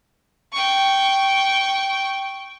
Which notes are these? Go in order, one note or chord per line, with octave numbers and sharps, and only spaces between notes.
G5 C#6